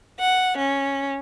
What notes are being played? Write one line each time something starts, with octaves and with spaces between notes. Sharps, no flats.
F#5
C#4